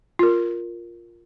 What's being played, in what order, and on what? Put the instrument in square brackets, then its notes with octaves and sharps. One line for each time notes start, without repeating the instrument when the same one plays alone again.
[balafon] F4 A#4